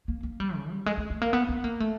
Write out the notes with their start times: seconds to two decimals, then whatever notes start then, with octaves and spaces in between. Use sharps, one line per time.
0.08 A#3
0.23 A#3
0.40 G3
0.56 C#3
0.70 G3
0.86 G#3
0.98 G#3
1.10 A3
1.22 A#3
1.33 B3
1.49 B3
1.64 A#3
1.80 A3